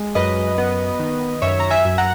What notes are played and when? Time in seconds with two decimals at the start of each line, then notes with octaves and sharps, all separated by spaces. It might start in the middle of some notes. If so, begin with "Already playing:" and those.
Already playing: G#3
0.15 F#2 B4 D#5
0.58 B3
0.99 D#3
1.42 F#2 C#5 E5
1.60 A#5
1.70 E5 G#5
1.85 F#2
1.98 F#5 A#5